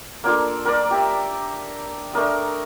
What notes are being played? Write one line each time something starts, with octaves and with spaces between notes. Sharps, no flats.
A#3 D4 F4 A4
A#4 D5
G4 E5
A3 D4 A#4 D#6